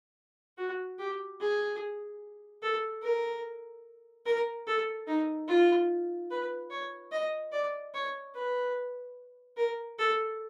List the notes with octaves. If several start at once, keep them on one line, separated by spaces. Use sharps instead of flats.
F#4
G4
G#4
A4
A#4
A#4
A4
D#4
F4
B4
C#5
D#5
D5
C#5
B4
A#4
A4